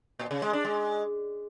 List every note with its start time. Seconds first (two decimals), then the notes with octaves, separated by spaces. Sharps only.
0.19 A#2
0.31 C#3
0.42 G#3
0.53 D4
0.65 G#3